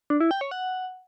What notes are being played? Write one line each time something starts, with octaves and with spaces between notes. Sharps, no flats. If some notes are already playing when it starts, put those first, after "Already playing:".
D4
E4
G5
C#5
F#5